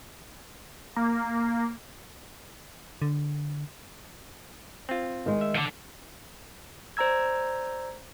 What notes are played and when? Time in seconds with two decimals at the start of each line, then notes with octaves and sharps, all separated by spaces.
0.96 A#3
3.02 D3
4.89 C4 F4
5.26 D#3 G#3
5.41 E5
5.55 D3 F3
6.97 C5 D5 A#5 E6 G#6